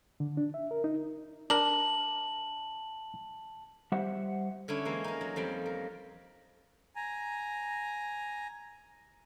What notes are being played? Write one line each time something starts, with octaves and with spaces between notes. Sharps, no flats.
D3
D4
E5
A#4
D#4
D4 A#4 A5 F#7
G3 G4 C5 E5 F#5
D3 C#4 D4 E4
E3 G#3 A#3
D#4 A#4
F#3
F2 F3 G3 G5
A#4
G#5 A#5